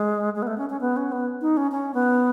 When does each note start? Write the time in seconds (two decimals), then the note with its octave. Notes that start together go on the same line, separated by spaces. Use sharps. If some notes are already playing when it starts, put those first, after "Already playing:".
Already playing: G#3
0.36 G#3
0.42 B3
0.47 A3
0.58 C#4
0.70 C#4
0.81 B3
0.97 C#4
1.12 B3
1.41 D#4
1.57 C#4
1.72 C#4
1.94 B3